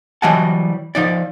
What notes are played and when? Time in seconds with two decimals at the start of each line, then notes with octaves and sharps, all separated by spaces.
0.22 E3 F#3 G3 D#5 F#5 A5
0.95 F3 D#4 D5